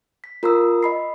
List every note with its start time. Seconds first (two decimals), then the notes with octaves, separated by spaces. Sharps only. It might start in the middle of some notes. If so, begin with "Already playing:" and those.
0.24 B6
0.43 F4 A#4 A#5 C6 D#6 E6
0.83 D#5 B5 C7